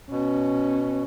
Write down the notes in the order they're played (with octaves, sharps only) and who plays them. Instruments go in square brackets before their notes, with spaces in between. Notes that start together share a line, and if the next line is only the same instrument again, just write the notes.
[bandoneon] B2 [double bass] C#4